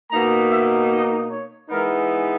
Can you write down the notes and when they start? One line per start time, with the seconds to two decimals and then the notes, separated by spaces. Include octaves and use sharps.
0.10 B2 A#3 D#4 A#5
0.50 E5
0.90 D#5
1.29 C#5
1.69 E3 G#3 B3 D#4 A#4